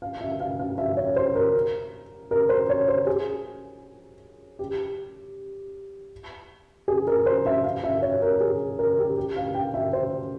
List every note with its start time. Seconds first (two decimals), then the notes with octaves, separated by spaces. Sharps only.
0.02 F5
0.21 E5
0.40 F5
0.60 F5
0.78 E5
0.97 C#5
1.16 C5
1.35 A#4
2.31 A#4
2.49 C5
2.69 C#5
2.88 C5
3.06 G#4
4.59 G4
6.88 G#4
7.07 A#4
7.26 C5
7.46 E5
7.64 F5
7.84 E5
8.02 C#5
8.22 A#4
8.41 G#4
8.79 A#4
8.98 G4
9.17 G4
9.36 F5
9.54 G5
9.74 E5
9.93 C5